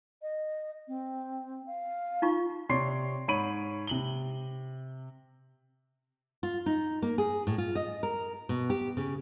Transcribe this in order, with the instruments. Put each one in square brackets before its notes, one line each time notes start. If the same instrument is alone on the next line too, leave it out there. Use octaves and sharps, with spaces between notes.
[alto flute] D#5
C4
F5
[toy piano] D#4 F4 C#6
[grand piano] C3 C#5 D5 C6 C7
G#2 C#5 B5 D7 D#7 F#7
C3 F#7 G7
[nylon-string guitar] F4
D#4
A#3
G#4
A2
F4
D#5
A#4
B2
G4
C#3